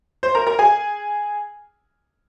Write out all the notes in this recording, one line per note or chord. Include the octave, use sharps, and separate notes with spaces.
C5 C6
A#4 A#5
A#4 A#5
G#4 G#5